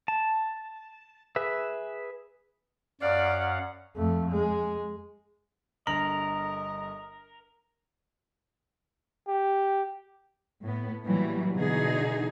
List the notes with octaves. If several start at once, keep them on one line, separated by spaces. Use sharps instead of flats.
A5
G#4 B4 E5
F#2 D5 F5 F#5
F2 A3
G#3
G1 D3 A#4 D#5 A#5 F#7
G4
A2 B3
A#2 E3 F#3 G3
B2 D3 E3 D#4 G#4